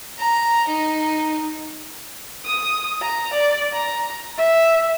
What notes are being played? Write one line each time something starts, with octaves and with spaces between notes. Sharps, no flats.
A#5
D#4
D#6
A#5
D5
A#5
E5